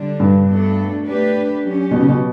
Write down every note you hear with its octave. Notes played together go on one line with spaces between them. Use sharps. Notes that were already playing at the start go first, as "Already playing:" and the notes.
Already playing: D3 G3 D4
G2
B2 A3 D4 A4
A3 D4 G4 B4
F#3 C#4 G4
B2
C#3
B2